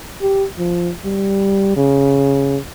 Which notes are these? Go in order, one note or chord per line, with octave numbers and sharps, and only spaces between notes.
G4
F3
G3
C#3